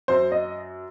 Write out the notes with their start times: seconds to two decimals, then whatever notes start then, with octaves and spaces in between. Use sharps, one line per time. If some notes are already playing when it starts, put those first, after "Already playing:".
0.08 F#2 C5
0.32 D#5